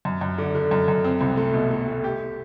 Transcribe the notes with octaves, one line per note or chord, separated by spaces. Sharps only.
F#2
F#2
D3
D3
F#2
F#2
C4
C2
A3
B2
A3
A3
G4